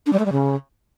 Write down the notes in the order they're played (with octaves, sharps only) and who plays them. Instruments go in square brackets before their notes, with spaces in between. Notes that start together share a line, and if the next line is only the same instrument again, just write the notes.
[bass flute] D4
G3
A3
G3
C#3